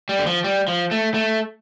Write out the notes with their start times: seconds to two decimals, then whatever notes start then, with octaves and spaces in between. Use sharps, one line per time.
0.09 G3
0.19 D3
0.27 F3
0.44 G3
0.68 F3
0.91 A3
1.14 A3